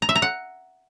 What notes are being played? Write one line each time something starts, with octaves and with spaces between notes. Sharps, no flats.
A#5
E5
A#5
F#5